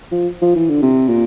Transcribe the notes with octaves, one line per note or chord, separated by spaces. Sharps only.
F3
F3
E3
D3
C3
A#2